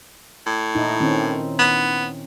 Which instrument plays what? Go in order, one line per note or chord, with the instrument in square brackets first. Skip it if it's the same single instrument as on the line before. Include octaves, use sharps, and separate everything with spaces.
[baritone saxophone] A2
[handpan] A#2 D#4 E4
D#3 C4 C#4
[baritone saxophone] B3